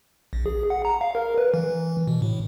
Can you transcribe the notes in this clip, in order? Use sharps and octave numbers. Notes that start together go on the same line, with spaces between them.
A#1
G#4
F#5
A#5
F5
A#4
B4
E3
B2
A2